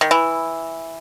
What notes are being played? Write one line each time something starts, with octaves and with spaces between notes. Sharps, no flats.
D#3
E3